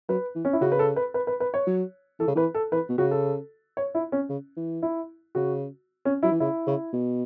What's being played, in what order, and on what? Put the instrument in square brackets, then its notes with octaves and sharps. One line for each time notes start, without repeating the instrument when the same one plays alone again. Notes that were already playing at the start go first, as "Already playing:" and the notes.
[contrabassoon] F#3 [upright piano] B4
[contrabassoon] E3
[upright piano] C#4
E4
[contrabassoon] C#3 [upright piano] F#4
[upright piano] B4
A4
B4
B4
B4
B4
C#5
[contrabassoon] F#3
[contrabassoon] E3 [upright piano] A4
[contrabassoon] C#3
[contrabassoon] E3 [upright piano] B4
[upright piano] A4
[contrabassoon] E3 [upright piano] B4
[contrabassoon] B2
[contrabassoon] C#3 [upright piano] F#4
[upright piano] A4
C#5
E4
C#4
[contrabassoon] C#3
E3
[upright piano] E4
[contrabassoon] C#3 [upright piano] F#4
[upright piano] C#4
[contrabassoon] F#3 [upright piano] E4
[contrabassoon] E3
[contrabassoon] C#3 [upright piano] E4
[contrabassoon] C#3
B2